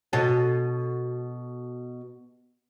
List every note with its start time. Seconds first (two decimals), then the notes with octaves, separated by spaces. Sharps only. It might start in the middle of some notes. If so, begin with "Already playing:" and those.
0.13 B2 F#4 A4